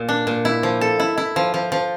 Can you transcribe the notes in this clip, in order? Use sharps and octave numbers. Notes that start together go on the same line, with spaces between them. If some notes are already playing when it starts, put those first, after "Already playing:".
Already playing: A#2
D4
A#2
E4
F3
A4
E4
E4
F3
F3
F3